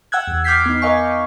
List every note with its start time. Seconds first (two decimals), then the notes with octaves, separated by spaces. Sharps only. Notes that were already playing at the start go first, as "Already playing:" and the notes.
0.12 F#5 G5 E6 F#6 G#6
0.27 E2
0.44 D6 F6 G6 G#6 B6 C7
0.66 B3 D#4
0.82 A#4 D#5 F5 G#5 C#6